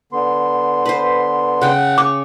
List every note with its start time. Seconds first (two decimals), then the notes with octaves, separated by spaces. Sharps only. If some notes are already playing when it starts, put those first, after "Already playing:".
0.12 D3 B3 C6
0.86 B4 C5
1.62 C#3 F#5 G5
1.98 C#5 D6